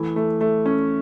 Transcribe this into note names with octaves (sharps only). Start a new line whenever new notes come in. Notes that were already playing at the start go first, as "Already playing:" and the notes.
Already playing: E3 A3
A3
A3
C#4